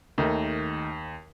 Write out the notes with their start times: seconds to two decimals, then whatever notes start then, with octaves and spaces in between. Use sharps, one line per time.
0.18 D#2 D#3 A3 D#4